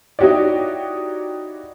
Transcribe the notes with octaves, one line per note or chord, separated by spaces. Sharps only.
D#4 E4 F#4 G4 C#5 D5